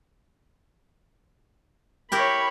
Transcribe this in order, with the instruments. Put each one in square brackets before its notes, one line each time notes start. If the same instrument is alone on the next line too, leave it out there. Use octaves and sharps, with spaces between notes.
[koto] E4 G4 A#4 [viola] C#5 B5